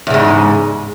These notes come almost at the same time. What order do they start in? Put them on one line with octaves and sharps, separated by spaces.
E2 C#3 G#2